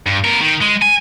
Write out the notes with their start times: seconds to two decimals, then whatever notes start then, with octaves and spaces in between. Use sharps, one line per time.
0.06 G2
0.25 B3 A#4
0.41 D#3
0.61 G#3
0.82 G#5